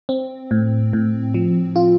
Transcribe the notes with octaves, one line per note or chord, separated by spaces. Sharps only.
C4
A2
A2
F3
F4